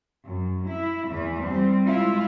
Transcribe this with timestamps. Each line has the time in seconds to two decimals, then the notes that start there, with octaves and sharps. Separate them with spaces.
0.25 F#2
0.68 E4
1.08 E2 E3
1.44 G3 C4
1.85 G#3 E4 F4